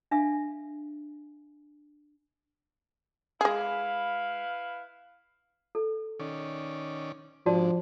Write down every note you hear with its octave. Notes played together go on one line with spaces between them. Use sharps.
D4 E5 F5 G#5
G#3 E4 G#4 B4 F5
A4
D#3 C#4 D5
G#2 F3 D4 F#4 D5 A5